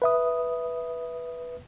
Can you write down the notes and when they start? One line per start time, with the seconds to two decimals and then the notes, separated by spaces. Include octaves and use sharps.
0.02 B4 E5 D#6